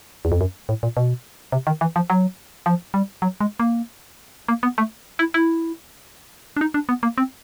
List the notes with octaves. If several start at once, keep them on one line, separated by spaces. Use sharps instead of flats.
E2
F2
F#2
A2
A#2
B2
C3
D#3
E3
F3
F#3
F3
G3
F#3
G#3
A#3
A#3
B3
A3
E4
E4
D4
D#4
D4
B3
A#3
C4